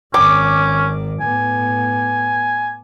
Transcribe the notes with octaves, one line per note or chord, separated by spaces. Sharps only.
G#1 D#3 C#4 D6
A2 B3 G#5